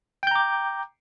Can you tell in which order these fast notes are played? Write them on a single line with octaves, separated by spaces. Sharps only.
G5 G6 A#5 D6